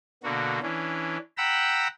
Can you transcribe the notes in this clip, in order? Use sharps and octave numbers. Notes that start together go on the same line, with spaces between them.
B2 D3 A#3 F#4
E3 C#4 D4
F#5 G5 A#5 B5 E6